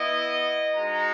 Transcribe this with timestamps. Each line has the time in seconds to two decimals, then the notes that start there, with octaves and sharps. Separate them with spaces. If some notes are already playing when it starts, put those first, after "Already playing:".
Already playing: B3 E4 D#5
0.75 G#3 D#4 F#4 A#5